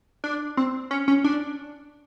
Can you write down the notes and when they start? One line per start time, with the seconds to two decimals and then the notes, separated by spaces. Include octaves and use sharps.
0.24 D4
0.57 C4
0.91 C#4
1.08 C#4
1.24 D4